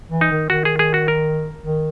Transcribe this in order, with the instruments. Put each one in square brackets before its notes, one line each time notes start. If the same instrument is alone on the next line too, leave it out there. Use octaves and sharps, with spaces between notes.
[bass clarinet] E3
[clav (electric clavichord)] D#4
[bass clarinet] D#3
[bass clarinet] D#3 [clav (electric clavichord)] F#4
[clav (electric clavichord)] G#4
G#4
F#4
A#4
[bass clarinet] D#3